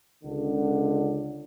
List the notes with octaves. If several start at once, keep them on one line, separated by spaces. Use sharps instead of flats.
C#2 D3